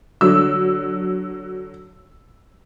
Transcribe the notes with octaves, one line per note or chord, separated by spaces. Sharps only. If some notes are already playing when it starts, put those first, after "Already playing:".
D3 F#3 E6